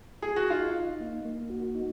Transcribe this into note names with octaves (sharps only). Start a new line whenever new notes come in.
G#4
F#4
D#4 F4
D#4
A#3
A#3
F#4
D#4